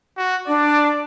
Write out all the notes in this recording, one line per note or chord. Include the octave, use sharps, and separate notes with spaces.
F#4
D4 D5